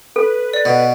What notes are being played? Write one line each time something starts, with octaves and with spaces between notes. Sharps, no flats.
A4 B4
D5
B2